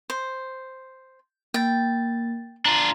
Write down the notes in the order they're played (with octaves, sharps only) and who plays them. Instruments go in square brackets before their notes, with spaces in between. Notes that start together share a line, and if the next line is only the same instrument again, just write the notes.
[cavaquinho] C5
[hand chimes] A#3 A6 [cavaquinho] G5
[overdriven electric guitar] D4 F4 [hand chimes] A#5